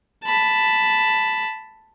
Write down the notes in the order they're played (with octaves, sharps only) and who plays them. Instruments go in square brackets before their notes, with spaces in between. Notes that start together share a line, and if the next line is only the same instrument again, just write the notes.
[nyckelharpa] A5 B5